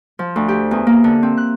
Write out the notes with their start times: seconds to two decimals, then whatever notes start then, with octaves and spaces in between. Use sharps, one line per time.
0.19 F3
0.36 D2
0.48 G4
0.71 E2
0.87 A#3
1.04 D3
1.23 C4
1.37 F#6